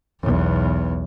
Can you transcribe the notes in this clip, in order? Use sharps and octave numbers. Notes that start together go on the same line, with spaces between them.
B1 E2